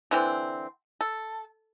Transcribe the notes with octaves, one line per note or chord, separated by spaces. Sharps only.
D3 E3 C4
A4